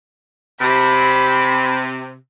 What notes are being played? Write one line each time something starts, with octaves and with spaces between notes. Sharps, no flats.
C3 B5